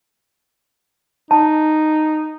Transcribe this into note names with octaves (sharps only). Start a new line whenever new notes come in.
D#4 A5